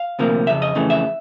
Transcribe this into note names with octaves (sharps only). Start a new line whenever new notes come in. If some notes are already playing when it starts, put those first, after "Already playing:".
Already playing: F5
D2 C3 F3 A#3
F2 C#3 E5
D#5
F2 C#3 E3 A3
E5